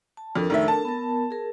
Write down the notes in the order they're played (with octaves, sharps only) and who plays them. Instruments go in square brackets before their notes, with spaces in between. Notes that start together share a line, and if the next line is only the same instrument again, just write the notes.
[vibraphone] A5
[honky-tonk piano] F2 [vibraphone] D4 A4 A#4
[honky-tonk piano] F1 D#3 E5
A5
[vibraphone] B3 A#4
G#4 A#4